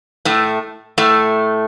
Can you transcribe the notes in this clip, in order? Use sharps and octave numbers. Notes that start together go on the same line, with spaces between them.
A2 A3
A2 A3